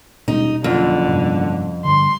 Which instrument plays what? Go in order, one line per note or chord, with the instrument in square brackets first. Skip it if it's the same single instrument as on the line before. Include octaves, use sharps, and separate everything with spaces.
[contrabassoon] D#1 [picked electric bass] B2 G#3 [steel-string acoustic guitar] D#4
[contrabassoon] F#1 [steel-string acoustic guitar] F2 [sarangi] D3
[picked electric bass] G2 C3
[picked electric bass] G2 D3 [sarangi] C6